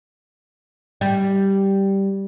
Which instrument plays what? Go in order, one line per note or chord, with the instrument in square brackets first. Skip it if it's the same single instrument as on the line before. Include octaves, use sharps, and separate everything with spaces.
[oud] G3